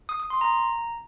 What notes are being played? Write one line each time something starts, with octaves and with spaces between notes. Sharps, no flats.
D#6
D#6
C6
A#5